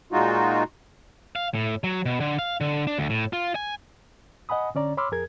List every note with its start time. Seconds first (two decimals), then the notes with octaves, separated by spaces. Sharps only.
0.12 A#2 G#3 D#4 F4 F#4
1.36 F5
1.54 A2
1.84 F#3
2.05 B2
2.20 D3
2.39 F5
2.61 D3
2.87 D4
2.99 D2
3.10 A2
3.33 F4
3.55 G#5
4.49 D#5 F#5 G#5 B5 D#6
4.75 D3 C#4 D5 A#5
4.97 C#5 B5 C6 D6 E6 F6
5.12 F2 G#4 A#4 G#6